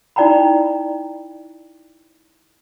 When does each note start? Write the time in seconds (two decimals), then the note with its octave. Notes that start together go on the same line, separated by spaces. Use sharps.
0.16 D#4 E4 D5 G5 A#5 B5